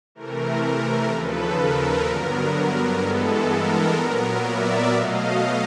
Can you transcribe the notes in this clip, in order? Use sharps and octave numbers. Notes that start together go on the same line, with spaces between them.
C3 E3 A3 A#4
A#4
D#2 C#3 F3 A4 B4
A#4
G2 D3 F#3 B3 A#4
G2 E3 G#3 B3 A4
A#4
A#2 F#3 B3
D5 E5
B2 F#3 A3 D#5 F5